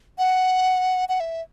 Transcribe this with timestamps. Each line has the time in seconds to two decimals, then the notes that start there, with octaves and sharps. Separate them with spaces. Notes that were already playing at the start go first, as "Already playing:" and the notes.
0.18 F#5
1.09 F#5
1.20 E5